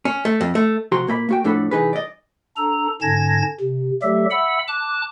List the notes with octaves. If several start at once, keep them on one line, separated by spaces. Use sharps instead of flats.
C#4
A3
F2
A3
C3 F3 F#4 A#5 C6
A#2 A#3 D#5 B5
A#3 F#4 G5
F2 A2 D4 A4 F#5 B5
C2 E3 D#4 G#4 B4
D5 D#5
D4 A4 A#5
G#2 D3 C#4 A5 G#6 A#6
C3
F#3 G3 A3 G4 A4 E5
E5 F#5 B5 E6
A5 D6 F#6